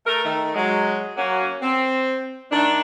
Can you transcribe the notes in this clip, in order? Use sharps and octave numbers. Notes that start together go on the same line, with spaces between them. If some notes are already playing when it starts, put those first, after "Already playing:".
A3 A#4
D#3 A3
F#3 G#3
F#3 A#3 C#4 F#4
C4
D#3 A3 D4